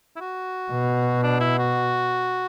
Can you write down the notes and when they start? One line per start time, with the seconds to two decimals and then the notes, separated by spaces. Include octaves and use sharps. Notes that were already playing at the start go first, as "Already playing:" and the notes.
0.16 E4
0.21 F#4
0.72 B2
1.23 D4
1.41 E4
1.59 F#4